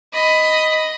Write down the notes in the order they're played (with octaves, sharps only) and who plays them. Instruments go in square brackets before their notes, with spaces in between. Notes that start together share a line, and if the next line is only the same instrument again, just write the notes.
[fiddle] D#5 B5